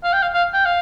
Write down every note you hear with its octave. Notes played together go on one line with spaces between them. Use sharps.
F5
G5
F5
F5
G5
F5